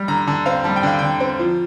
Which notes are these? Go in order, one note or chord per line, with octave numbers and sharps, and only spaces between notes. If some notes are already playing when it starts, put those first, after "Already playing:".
Already playing: G3
D3 A#5
D3 A5
C4 F5
G3 A5
G5
D3 F5
D3 G5
C4
F3